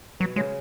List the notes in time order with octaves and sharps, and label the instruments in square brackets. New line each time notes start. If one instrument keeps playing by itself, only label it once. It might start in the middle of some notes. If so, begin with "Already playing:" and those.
[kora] B2 [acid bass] F#3
[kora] C#3 [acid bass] G#3